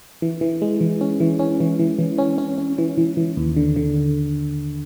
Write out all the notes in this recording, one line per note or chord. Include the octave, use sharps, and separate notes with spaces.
E3
E3
G#3
E3
C#4
E3
C#4
E3
E3
E3
C#4
C#4
C#4
E3
E3
E3
D#2
D3
D3